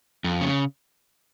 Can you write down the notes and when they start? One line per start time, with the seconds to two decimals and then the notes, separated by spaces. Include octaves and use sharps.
0.24 F2
0.41 C#3